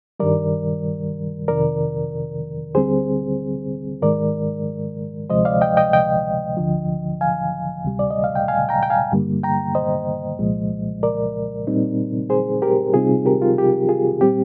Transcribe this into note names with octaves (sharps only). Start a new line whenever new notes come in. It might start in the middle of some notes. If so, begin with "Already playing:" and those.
G2 D#3 G3 A#4 D5
F2 C3 D#3 A#4 D5
D2 D3 G3 C4 G#4 C5
G#2 D#3 G#3 A#4 D5
D2 C3 F3 G#3 C5 D#5
D5 F5
D#5 G5
D#5 G5
D#5 G5
D2 D3 F3
F5 G#5
D2 C3 G3
D5
D#5
F5
G5
F5 G#5
G5 A#5
G5
F5 G#5
G2 D3 G3 A#3
G5 A#5
C5 D#5
C2 A#2 F3 G#3
A#4 D5
A#2 G3 C4 D#4
G#4 C5
G4 A#4
C3 G3 C4 D#4 F4 G#4
G4 A#4
F4
G4
F4 G#4
A#2 G3 C4 G4